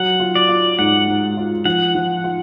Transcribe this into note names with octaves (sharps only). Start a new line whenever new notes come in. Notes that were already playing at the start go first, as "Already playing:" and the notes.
Already playing: F#3 F#5
F4
D5
F4
G#2 F#5
G#2
F4
F3 F#5
F3
F4